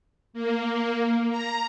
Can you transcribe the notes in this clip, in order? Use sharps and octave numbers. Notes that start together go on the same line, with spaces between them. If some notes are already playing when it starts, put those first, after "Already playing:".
A#3
A#5